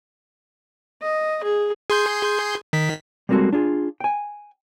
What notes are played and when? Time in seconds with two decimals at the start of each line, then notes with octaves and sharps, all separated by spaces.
1.02 D#5
1.44 G#4
1.90 G#4 C6 G6
2.73 D#3 B6
3.29 G3 G#3 A#3 C4 F#4 A4
3.53 D4 F4 G#4
4.00 G5 G#5